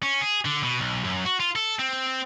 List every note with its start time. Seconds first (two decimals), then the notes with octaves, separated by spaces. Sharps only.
0.03 C#4
0.21 G#4
0.45 D3
0.63 B2
0.80 B1
1.04 F#2
1.25 F#4
1.40 F4
1.56 A4
1.79 C4